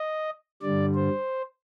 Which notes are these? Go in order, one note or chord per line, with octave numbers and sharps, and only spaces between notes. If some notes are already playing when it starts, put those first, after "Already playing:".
Already playing: D#5
G2 D3 G3 D5
C5